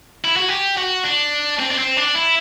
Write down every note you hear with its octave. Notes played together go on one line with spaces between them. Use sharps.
E4
F#4
G4
F#4
D4
C4
D4
C4
D4
E4